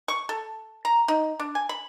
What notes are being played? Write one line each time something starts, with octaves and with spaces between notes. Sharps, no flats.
C#6
A4
A#5
D#4
D4
G#5
B5